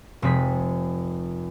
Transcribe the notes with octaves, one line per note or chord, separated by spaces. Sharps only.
F1 G#3 C4 G#4 B6